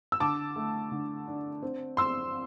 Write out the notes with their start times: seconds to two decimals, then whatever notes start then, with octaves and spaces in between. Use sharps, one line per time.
0.12 E6
0.20 D3 A5 D6
0.56 A3
0.92 D3
1.27 D4
1.62 C4
1.97 C4 C6 E6